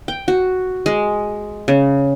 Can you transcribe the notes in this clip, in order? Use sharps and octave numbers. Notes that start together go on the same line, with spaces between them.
G5
F#4
G#3
C#3